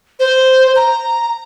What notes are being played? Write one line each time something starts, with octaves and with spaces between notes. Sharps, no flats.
C5
A#5